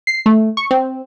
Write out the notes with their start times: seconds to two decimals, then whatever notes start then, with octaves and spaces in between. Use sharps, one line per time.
0.07 C7
0.26 A3
0.57 C#6
0.71 C4